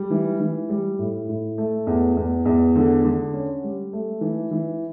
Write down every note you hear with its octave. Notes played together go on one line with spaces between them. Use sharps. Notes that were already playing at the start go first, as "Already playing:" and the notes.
Already playing: G3
E3
E3
G3
A2
A2
A3
E2
E2
E2
D3
D3
C#4
G3
A3
E3
E3